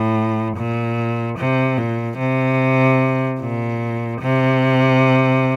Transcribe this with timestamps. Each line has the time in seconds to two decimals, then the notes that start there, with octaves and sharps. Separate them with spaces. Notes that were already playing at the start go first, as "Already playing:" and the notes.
Already playing: A2
0.57 A#2
1.38 C3
1.77 A#2
2.19 C3
3.41 A#2
4.21 C3